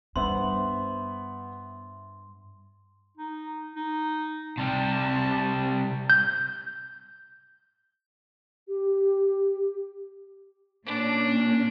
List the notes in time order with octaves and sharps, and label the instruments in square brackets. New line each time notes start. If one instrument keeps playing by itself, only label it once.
[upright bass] G2 [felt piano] B3 C5 E5 [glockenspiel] C6
[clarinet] D#4
D#4
[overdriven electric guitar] C3 G3 [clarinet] A5
[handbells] G6
[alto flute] G4
[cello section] A#2 A#3 C#4 [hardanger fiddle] D4